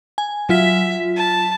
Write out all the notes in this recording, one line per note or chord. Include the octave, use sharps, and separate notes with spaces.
G#5
F#3 F4 E5 B6
A5